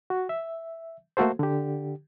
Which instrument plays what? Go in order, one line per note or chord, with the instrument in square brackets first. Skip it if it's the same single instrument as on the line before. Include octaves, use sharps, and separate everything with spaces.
[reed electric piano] F#4
E5
A3 A#3 F#4 A4 C5
D3 G4